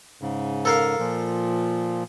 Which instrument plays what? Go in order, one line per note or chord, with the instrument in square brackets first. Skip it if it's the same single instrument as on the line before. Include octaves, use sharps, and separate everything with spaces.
[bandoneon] G#2 C#3
[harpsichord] A4 A#4 F5
[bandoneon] A#2 F3